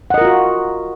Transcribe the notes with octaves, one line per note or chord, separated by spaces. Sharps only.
F4 F#4 A#4 D#5 F#5